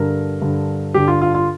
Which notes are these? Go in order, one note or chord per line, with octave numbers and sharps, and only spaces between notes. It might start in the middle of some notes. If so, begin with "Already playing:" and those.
Already playing: G2 D3 A#4
G2 D3
G2 D3 G4
F4
F4
F4